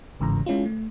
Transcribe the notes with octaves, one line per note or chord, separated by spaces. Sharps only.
G1 G#2 C#3 E3 A#5
G#3 C#4 E4 F4
A3